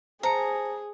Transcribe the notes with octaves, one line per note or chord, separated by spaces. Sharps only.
G#4 C5 A5 A#5 C#7